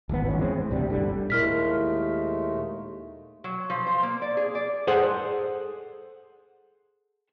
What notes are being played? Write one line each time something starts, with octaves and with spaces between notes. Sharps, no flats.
D1 G#1 D2 B3
G#1 F2 C#4
E3 G#3 C4
A2
D2 C3 G3
G1 D3 G3
D#2 A#2 G#3 A3 E4 A#4 F6 B6
F#3
F3
C5
A#3
D5
G#4
D5
G#4 A4 C5 F#5